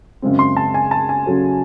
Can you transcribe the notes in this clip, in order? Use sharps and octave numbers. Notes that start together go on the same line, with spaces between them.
F#2 C#3 G#3 C4
C6
A5
G#5
A5
G#5
C#3 F#3 C#4 F#4 A4